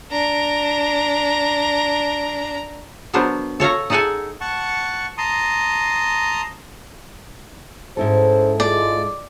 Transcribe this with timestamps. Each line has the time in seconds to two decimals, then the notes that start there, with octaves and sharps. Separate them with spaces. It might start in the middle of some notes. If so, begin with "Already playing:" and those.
0.11 D4 A#5
3.13 F#3 B3 D4 A#4 C5
3.60 A4 C#5 F5 A#5
3.90 D#4 G#4 A4 F#5 G#5 A5
4.41 F#5 A5 C#6
5.18 A5 A#5 C6 D#6
7.97 G#2 C#4 E4 A4 C5
8.60 G#3 F4 D5